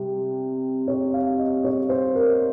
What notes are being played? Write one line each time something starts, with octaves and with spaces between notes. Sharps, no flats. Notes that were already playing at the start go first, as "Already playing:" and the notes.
Already playing: C3 G3
C#5
F5
D#5
C#5
C5
A#4